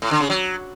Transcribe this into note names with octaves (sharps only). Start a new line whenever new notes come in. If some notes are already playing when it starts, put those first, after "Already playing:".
A2
D3
C#3
F#3